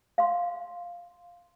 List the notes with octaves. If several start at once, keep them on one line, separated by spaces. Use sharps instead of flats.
F5 C6